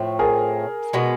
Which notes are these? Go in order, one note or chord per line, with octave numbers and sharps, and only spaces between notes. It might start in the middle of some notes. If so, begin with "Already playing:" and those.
Already playing: A2 F3 A3 C4
G#4 A#4
B2 G#3 B3